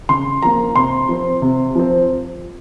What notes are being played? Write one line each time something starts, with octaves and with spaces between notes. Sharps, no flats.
C#3 C6
F3 A#3 A#5
C3 C6
F3 C4
C3
F3 C4